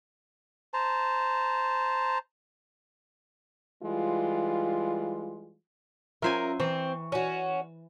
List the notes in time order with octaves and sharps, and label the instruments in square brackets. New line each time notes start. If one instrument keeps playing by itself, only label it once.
[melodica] C5 A5 A#5
[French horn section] E3 G3 G#3 F4
[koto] F#3 C5 G#5 [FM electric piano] C#4 F4 E5 [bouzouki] A#4
[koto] E3 [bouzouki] C4 [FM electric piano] C#6
[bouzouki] C#4 F#4